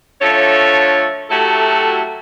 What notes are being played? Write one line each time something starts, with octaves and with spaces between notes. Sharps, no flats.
D3 F3 A3 A4 C#5
F#3 A3 E4 F#4 G4 A4